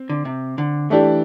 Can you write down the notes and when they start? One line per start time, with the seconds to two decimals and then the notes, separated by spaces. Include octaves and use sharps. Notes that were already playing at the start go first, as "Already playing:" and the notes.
Already playing: C4
0.09 D3
0.25 C3
0.58 D3
0.90 E3 A3 D4 G4 D5